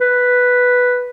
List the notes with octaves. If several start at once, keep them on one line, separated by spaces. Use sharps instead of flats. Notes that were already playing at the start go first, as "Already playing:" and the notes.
B4